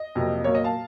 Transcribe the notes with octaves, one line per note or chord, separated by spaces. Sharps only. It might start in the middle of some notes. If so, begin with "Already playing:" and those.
Already playing: D#5
F2 C3 F#3 A#3
A#2 F#3 A#3 C#5
D#5
F5 A5